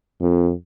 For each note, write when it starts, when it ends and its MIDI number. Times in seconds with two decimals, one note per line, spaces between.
0.21 0.52 41